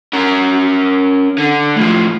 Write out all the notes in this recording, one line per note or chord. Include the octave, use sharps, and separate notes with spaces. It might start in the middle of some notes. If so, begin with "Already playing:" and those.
C#4 A#4
D3
A2 F3